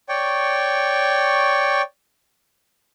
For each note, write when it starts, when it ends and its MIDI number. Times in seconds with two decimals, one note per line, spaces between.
0.09 1.82 73
0.09 1.82 74
0.09 1.82 79
0.09 1.82 85